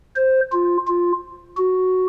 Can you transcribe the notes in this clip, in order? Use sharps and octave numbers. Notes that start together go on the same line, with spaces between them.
C5
F4
F4
F#4